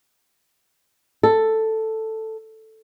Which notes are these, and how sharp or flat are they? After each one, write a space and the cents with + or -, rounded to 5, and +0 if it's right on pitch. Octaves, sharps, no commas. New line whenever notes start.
A4 +5